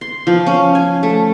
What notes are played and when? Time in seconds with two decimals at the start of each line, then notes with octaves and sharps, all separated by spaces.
0.01 C6
0.27 F3
0.46 C#4
0.75 G#5
1.03 A3